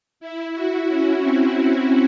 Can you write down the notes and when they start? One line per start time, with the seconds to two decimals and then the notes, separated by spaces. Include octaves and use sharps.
0.20 E4
0.54 F#4
0.88 C#4
1.22 C4